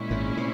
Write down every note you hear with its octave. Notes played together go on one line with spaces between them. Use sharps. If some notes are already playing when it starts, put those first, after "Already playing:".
Already playing: A#2 G#3 C#4 E4
G#1 G#2
C3